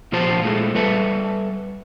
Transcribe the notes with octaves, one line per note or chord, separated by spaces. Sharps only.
A#2 F3 F4 G4 C5 A5
A#2 G#3 A3
G3 A4 B4 E5 A5